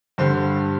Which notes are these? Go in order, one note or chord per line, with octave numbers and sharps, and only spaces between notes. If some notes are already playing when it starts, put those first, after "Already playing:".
G2 D3 G3 C5